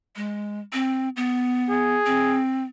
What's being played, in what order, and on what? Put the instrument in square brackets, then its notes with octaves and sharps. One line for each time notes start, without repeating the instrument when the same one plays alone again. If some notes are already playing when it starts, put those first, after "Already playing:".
[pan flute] G#3
C4
B3
[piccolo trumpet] G#4
[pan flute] C4